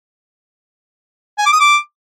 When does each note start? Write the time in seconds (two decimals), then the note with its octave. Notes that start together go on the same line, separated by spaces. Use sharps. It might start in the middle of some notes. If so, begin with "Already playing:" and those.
1.38 G#5
1.45 D6
1.53 D#6
1.60 D6